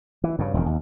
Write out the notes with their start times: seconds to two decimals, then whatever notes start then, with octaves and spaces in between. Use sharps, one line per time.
0.24 E3
0.39 G2 C#3
0.54 E1 F2 D#3
0.66 D#2